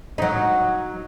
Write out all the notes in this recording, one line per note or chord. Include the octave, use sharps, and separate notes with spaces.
F#3 D#4